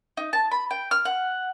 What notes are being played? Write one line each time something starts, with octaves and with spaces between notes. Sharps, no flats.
D#4
A5
B5
G5
F6
F#5